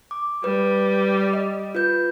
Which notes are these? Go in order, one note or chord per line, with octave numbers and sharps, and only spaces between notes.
D6
G3 B4
D#5
F4 B4 G6